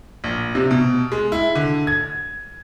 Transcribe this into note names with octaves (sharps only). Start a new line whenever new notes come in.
A#1
C3
B2
G#3
E4
D3
G#6